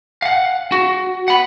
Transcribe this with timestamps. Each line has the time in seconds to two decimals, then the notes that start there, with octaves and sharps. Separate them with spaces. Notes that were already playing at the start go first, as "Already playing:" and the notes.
0.22 F5 F#5
0.72 F#4
1.28 F#5 B5